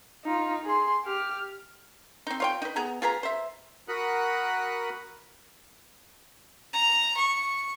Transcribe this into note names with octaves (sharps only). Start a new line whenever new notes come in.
D#4 F4
G#4 C6
G4 F6
C4 D#4
F4 C#5 G5
D#4 B4
B3 G#4 A#5
F4 G#4 B4 A#5
C5 E5
F#4 A#4 F#5 B5 D#6 F#6
A#5
C#6